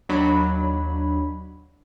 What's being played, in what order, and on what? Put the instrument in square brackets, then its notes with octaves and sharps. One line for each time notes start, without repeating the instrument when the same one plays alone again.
[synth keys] D#2 F#3 D4 B5